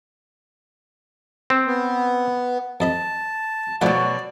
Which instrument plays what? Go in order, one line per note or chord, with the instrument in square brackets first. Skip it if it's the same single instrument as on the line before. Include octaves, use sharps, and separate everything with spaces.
[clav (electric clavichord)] C4
[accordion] B3
[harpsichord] F2 D#5 B5 [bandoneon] A5
[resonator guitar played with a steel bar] B2 F#3 [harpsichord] F3 A3 F#5 [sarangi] D5